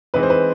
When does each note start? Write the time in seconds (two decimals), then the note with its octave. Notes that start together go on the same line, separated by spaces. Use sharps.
0.14 E3 G#3 C4 D#4 B4
0.23 C5
0.30 B4